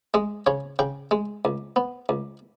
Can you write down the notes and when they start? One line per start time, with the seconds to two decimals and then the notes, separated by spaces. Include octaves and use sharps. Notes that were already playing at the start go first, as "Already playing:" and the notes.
0.14 G#3 D#5
0.46 C#3 C#5
0.79 C#3 G5
1.11 G#3
1.45 C#2
1.76 B3
2.09 C#2